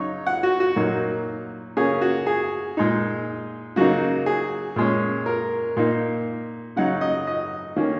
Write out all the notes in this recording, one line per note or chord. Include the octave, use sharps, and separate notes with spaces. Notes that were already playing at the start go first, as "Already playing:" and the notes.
Already playing: C#3 F#3 D#4 C#5
F#5
F#4
F#4
A#2 F#3 A#3 D#4
C#3 A#3 C#4 G#4
F#4
G#4
A#2 G#3 D#4
C#3 F#3 A#3 D#4 F#4
G#4
A#2 G#3 C#4
A#4
A#2 A#3 D#4
C#3 F#3 D#4 F#5
D#5
D#5
D#3 A#3 C#4